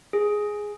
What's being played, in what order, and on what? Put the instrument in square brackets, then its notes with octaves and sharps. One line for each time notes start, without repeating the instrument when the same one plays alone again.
[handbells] G#4